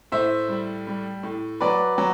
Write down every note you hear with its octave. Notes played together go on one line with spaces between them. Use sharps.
A2 C5 E5
G3
G3
A2
F#3 B4 D5
F#3